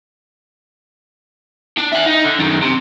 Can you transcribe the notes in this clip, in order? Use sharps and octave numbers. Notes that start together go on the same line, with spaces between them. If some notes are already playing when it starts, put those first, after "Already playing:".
D4
E5 F#5
D#4
D3
F#2 D#3
C3